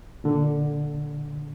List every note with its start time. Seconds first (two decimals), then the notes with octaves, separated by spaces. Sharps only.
0.24 A#2 D3